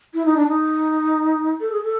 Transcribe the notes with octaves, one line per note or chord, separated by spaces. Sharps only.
E4
D#4
D4
D#4
A4
G#4
A4